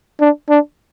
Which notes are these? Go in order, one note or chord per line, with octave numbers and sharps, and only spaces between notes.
D4
D4